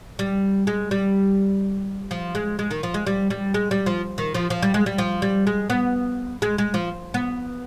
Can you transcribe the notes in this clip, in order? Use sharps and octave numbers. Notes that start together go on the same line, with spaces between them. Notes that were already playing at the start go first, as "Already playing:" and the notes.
G3
G#3
G3
F3
G#3
G#3
D#3
F3
G#3
G3
G3
G#3
G3
F3
D#3
F3
F3
G3
G#3
G3
F3
G3
G#3
B3
G#3
G#3
F3
B3